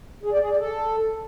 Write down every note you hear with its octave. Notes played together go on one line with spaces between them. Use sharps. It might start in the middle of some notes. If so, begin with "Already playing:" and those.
G#4
D5
G#4
D5
A4